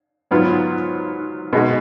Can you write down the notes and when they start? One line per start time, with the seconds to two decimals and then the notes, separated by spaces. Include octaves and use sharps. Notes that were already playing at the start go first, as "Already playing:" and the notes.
0.31 G#2 F#3 B3 F4
1.53 B2 G#3 D#4 F#4